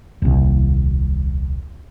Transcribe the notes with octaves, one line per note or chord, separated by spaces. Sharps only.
D#1 C2